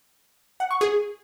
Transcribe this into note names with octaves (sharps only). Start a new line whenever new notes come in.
F#5
C#6
G#4